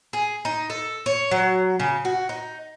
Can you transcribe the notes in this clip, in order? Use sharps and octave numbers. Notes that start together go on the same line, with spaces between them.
G#4
D#4
A4
C#5
F#3
C#3
F#4
D#4